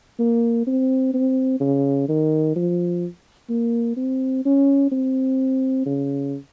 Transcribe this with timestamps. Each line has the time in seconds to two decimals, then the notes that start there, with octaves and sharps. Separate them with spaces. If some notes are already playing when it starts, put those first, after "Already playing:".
0.19 A#3
0.67 C4
1.14 C4
1.60 C#3
2.09 D#3
2.56 F3
3.49 A#3
3.97 C4
4.45 C#4
4.91 C4
5.86 C#3